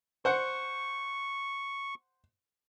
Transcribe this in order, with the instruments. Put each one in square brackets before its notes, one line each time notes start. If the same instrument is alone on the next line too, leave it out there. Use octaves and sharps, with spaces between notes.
[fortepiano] C5 F#5 [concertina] C#6